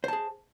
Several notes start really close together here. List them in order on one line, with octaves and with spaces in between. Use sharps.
C5 A5 G#4